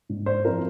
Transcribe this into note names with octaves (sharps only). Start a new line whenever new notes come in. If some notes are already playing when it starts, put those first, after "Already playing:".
G#2
C5
F3 C4 E4 A#4